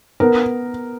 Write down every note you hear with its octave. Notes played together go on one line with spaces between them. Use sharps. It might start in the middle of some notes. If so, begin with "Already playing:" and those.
B3 A#4